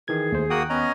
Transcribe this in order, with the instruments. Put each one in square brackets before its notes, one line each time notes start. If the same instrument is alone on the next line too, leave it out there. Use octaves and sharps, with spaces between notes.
[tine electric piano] D#3 E3 G#6 [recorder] G#4
[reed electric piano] D#2 [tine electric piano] A3 C5
[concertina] A#3 F#4 D#6 [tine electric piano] G5 F#6
[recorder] B3 [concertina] C#4 D#5 A#5